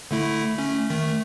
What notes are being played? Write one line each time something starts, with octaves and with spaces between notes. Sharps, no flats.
D3 A3 E4
A3 C#4
D#3 A3